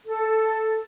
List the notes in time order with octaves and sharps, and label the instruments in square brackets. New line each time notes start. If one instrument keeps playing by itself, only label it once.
[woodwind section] A4